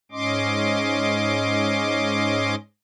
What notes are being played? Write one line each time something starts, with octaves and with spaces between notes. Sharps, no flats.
G#2 C#4 D#5 C6 D6